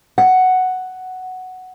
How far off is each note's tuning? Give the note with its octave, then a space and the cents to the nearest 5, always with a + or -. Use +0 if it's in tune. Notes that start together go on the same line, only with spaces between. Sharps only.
F#5 +5